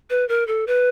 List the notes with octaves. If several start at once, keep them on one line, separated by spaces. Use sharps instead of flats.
B4
A#4
A4
B4